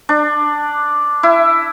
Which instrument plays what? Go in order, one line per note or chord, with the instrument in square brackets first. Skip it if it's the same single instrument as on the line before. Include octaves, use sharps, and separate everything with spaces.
[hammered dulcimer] D4
E4